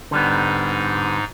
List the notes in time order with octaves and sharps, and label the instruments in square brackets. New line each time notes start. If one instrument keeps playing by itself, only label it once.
[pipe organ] G#2 D#4 [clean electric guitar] D3 G3 B3